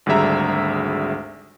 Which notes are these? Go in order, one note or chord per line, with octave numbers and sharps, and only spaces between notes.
G#1 D2 G3 G#4 E5 A#5